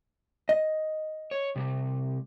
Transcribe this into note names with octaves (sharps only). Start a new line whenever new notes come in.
D#5
C#5
C3 G3